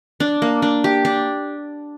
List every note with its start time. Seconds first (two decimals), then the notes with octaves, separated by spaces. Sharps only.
0.20 D4
0.42 A#3
0.62 D4
0.84 G4
1.05 D4